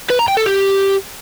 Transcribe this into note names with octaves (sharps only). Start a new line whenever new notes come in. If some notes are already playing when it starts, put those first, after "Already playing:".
B4
A#5
G5
A4
G4